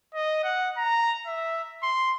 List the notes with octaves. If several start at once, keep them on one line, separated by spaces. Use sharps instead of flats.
D#5
F#5
A#5
E5
C6